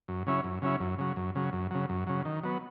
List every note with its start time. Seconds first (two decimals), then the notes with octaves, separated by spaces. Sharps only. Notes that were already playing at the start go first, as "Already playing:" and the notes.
0.08 F#2
0.27 C#3 F#3 C#4 E4
0.44 F#2
0.62 C#3 F#3 C#4 E4
0.80 F#2
0.98 C#3 F#3
1.16 F#2
1.35 C#3 F#3
1.53 F#2
1.71 C#3 F#3
1.89 F#2
2.07 C#3 F#3
2.25 D#3
2.43 F#3 B3